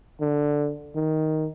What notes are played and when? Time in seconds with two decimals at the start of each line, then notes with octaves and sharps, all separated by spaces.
0.21 D3
0.95 D#3